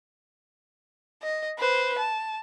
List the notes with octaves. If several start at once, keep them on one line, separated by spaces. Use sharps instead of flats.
D#5
B4 C5
A5